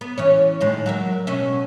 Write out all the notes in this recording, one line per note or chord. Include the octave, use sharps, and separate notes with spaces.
B3
E3 C#4 C#5
A2 D#3 G#3
F#3 A#4 E5
B2 C#4 E5